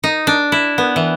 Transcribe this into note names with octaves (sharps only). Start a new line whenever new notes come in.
D#4
D4
E4
B3
E3